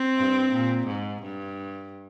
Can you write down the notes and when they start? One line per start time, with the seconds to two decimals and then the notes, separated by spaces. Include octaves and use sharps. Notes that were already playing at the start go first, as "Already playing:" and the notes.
Already playing: C4
0.16 G2
0.51 A#2
0.87 G#2
1.22 G2